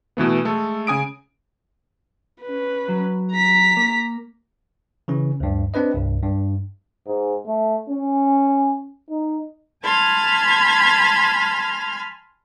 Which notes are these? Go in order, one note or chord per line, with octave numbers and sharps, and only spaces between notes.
B2 E3 A3 B3
G#3 A3 A4
C#3 G#5 D#6 D7
C#4 B4
F#3
A#5 B6
A#3
C#3 E3 C#4
D2 G2
C4 D4 B4 D#5
C2 G2
G2
G#2
A3
C#4
D#4
G#5 A5 B5 C6 F6 G#6